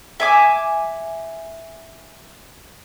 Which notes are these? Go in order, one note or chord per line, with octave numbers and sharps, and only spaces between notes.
E5 G#5 D6